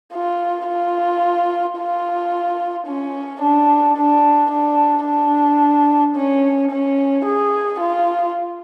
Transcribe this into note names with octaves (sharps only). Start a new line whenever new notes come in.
F4
F4
F4
C#4
D4
D4
D4
D4
C#4
C#4
G#4
F4